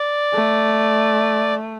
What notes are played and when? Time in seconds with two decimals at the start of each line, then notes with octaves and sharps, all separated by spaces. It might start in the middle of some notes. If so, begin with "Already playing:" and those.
Already playing: D5
0.34 A3